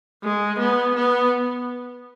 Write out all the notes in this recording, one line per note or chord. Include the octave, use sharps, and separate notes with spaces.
G#3
B3
B3